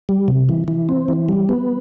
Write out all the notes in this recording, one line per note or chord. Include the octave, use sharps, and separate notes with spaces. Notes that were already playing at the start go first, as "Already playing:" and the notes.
G3
C3
E3
E3
C4
E3
G3
B3